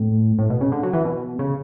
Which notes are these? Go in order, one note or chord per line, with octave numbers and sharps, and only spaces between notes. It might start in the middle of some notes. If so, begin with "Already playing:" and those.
Already playing: A2
A2
B2
C#3
D3
F#3
E3
B2
C#3